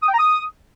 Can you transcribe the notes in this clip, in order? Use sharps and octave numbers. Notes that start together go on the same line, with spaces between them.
D#6
G5
A#5
D#6